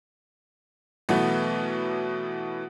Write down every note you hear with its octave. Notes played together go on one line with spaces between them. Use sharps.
B2 E3 F#3 A3 B3